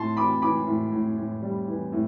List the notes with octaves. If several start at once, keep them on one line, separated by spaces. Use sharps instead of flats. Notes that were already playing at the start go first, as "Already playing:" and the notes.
Already playing: A2 A5 C6
E3 B5 D6
E3 B5 D6
A2
A2
A2
G3
E3
A2